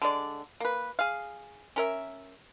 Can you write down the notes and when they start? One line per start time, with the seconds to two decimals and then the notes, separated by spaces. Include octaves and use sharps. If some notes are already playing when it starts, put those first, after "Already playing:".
0.02 D3 G#3 D5
0.60 A#3 B4
0.99 G#4 F5
1.76 C#4 A#4 E5